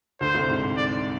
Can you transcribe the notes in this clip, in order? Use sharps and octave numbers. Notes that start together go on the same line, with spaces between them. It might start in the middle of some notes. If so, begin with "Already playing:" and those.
D2 D3 C5
C2 C3
G#2
D5